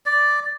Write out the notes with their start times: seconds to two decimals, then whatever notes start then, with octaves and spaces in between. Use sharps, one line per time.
0.06 D5